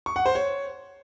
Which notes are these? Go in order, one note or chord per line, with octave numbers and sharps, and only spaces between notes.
C#6
F#5
C5
C#5